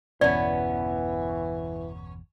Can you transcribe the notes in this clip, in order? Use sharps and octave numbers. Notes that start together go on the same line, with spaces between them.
G1 E2 B2 E3 B3 C#4 D5